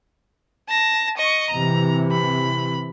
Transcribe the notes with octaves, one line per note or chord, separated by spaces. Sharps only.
A5 A#6
D#5 C#6
C3 E3 A#5
B5